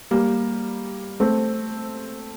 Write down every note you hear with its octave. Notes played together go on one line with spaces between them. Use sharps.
G3 A#3
A3 C4